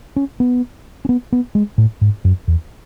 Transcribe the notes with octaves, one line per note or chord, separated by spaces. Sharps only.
C#4
B3
C#4
B3
B3
G#3
A2
G#2
F#2
E2